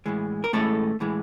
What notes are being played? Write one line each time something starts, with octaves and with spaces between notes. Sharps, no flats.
A2 E3 G#3
A#4
A2 E3 G#3 A3 A4
A2 E3 G#3